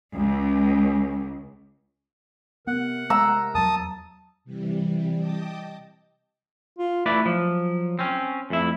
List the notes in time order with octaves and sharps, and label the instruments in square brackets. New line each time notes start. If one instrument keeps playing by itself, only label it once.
[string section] C#2
[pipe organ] C3 A#4 [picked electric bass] B3 [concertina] F#5
[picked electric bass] G#3 [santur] A#5 E6
[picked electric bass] E2 F#3 [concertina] A5 D#6
[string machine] C3 E3 G3
D#5 G5 A5 D6 D#6
[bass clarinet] F4
[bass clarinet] A3 [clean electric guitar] E4 B4 D5
[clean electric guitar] F3 [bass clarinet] F#3
[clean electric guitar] C4 C#4
[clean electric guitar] F2 E4 [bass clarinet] A3